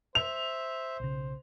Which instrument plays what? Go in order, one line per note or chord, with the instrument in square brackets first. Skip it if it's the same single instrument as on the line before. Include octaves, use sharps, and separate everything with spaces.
[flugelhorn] C5 [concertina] E5 [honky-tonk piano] F7
[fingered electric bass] B1 C#3